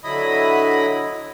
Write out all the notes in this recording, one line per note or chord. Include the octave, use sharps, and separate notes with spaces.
D3 F#3 E4 D#5 B5 D#6